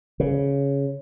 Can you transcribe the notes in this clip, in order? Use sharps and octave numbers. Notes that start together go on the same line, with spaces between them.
C#3